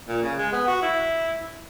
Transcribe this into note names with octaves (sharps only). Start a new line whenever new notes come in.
A#2
C#3
G#3
B3
F#4
E4